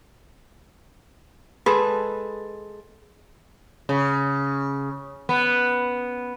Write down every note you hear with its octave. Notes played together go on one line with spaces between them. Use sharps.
G#3 G#4 A4 B4
C#3
B3